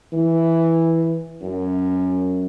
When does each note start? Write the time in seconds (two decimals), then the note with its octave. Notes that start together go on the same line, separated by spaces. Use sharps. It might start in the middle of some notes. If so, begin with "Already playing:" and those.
0.13 E3
1.42 F#2